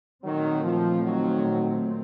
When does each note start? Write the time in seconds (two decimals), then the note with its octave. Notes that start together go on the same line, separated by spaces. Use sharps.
0.24 A#2 D#3 F#3 A3 C4
0.63 F3
1.02 D#3 F#3